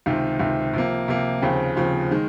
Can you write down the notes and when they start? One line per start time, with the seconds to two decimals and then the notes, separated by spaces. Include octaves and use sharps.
0.06 C#2 C3 D#3
0.39 C#2 C3 D#3
0.73 C3 F3 A#3
1.08 C3 F3 A#3
1.42 D#2 C#3 F3 C4
1.76 D#2 C#3 F3 C4
2.11 D#3 G#3